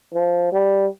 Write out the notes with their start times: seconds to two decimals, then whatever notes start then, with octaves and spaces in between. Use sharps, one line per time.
0.13 F3
0.52 G3